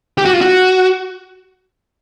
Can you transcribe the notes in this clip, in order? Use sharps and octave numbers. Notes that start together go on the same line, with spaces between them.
G4
F#4
F4
F#4